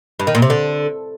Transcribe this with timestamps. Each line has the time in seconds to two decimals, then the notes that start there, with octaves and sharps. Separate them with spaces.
0.20 G2
0.27 D#3
0.35 A#2
0.42 C3
0.50 D3